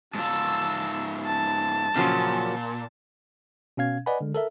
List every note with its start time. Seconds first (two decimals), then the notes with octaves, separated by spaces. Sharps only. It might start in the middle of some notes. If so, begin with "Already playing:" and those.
0.15 G#2 F4 A5 E6
1.25 A5
1.95 A#2 C#3 F3 F#3
3.77 B2 C#4 F5 G#6
4.06 B4 D5 D#5 F#5 G#5 B5
4.21 D3 G#3
4.34 A4 A#4 E5